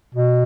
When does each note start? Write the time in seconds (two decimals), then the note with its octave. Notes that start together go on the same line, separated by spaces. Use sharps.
0.15 B2